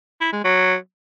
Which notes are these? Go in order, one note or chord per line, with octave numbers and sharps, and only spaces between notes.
E4
G#3
F#3